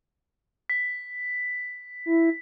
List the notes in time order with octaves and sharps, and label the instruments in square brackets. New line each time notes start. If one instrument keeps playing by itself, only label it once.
[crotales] B6
[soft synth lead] E4